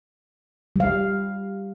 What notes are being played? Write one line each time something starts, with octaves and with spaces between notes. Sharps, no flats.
G3 F5